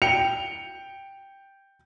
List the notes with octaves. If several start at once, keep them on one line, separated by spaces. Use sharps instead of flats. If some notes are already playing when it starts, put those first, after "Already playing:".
G5 C#7 F7